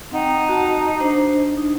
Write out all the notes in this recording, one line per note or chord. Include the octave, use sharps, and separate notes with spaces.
C4 D#4 F#5 G5
F#4 A5 A#5
D4 C5
D#4